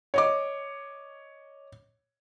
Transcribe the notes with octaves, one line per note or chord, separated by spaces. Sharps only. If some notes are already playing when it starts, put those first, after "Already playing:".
C#5 D#5 D6